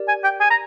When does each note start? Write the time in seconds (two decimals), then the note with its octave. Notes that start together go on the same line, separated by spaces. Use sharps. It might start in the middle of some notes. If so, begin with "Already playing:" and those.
Already playing: G4 A#4 D5
0.08 G#5
0.24 G5
0.40 G#5
0.50 A#5